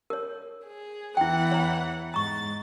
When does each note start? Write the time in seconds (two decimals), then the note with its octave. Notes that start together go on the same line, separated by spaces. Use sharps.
0.10 A#4 C#5
0.66 G#4
1.17 E2 E3 E4 F#5 G5
1.52 C#5 A#5
2.14 G#2 A#5 C#6 A6